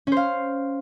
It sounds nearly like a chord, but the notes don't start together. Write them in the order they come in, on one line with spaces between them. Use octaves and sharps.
C#4 C5 F5